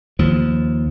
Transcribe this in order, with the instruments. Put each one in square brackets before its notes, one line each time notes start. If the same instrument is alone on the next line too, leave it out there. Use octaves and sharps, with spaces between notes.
[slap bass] D#2 F3